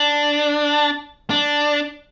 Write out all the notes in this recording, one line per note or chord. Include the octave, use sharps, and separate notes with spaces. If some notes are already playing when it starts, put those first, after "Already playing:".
Already playing: D4
D4